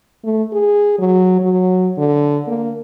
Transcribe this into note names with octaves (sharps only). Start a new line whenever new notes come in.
A3
G#4
F#3
F#3
D3
A#3